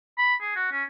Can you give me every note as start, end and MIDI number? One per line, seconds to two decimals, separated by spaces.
0.18 0.35 83
0.41 0.52 68
0.56 0.68 66
0.71 0.83 61